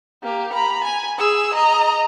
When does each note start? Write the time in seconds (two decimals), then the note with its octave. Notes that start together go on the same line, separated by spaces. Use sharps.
0.23 A#3 G4
0.53 A#5 B5
0.84 G#5
1.18 G#4 E6
1.54 D#5 A#5